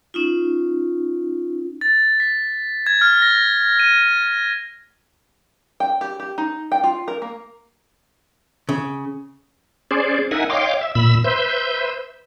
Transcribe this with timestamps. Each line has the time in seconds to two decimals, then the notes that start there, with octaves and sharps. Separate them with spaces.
0.14 C#4 D#4 F4
1.81 A6
2.20 B6
2.87 G#6
3.01 F6
3.22 A#6
3.79 D#7
5.80 G5
6.01 G4
6.20 G4
6.38 D#4
6.72 G5
6.84 F4
7.08 A#4
7.22 A#3
8.69 C#3
9.91 C#4 G#4 C5 D5
10.31 D#4 A#4 E5 F#5 G#5
10.50 C#5 D#5 F5 G5 C6 D6
10.81 E5
10.95 A#2 B5 E6
11.24 B4 C5 E5 G6